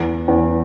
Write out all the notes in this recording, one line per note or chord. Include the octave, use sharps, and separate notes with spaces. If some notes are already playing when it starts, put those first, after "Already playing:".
Already playing: E2
E2